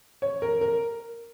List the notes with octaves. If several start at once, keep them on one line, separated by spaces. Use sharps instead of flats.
C#5
A#4
A#4